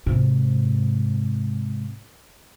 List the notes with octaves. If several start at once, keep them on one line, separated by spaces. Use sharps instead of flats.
G#2 C3